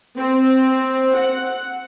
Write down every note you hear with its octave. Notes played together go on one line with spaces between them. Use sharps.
C4
F#5